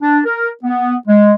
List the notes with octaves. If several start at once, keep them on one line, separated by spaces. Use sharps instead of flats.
D4
A#4
B3
G#3